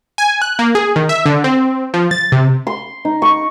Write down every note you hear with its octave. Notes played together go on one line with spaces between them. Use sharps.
G#5
F#6
A#3
G#4
D#3
E5
D3
C4
F3
A6
C3
C6
D#4
C#6